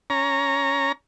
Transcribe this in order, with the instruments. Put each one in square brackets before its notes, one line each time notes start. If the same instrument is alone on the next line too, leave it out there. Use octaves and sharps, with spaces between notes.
[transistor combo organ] C#4 A#5